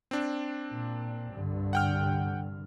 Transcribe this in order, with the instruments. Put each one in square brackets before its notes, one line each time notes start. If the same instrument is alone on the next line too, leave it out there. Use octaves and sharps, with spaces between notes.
[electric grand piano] C4 D4
[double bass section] A#2
C2 G2 D3
[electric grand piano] F#5 G5 F6